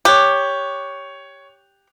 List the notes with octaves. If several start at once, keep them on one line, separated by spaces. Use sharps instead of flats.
G4 C#5 F#6